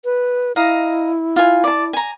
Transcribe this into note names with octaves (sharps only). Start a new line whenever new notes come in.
B4
E4 D#5 F5 A#5
F4 G#5
D5 A5
G#5 A#5